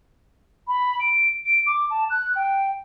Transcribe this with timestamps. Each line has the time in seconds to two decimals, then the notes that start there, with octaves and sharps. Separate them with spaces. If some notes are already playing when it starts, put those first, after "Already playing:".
0.68 B5
1.00 D7
1.46 D7
1.66 D6
1.90 A5
2.10 F#6
2.35 G5